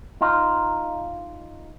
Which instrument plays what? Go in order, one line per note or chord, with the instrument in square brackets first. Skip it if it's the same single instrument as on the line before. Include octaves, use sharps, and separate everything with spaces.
[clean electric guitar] D#4 F4